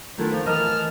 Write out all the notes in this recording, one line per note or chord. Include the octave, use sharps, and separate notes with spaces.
D#3 A3 B3 D4 E4 F4
F3 A#3
E3 A#4 D#5 A5 F6